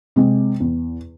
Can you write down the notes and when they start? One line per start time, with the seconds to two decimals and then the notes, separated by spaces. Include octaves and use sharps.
0.16 C3 G#3 C4
0.60 E2